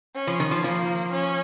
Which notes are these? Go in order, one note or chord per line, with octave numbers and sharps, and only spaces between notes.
C#4
F3
D#3
F3
F3 A#3
C#4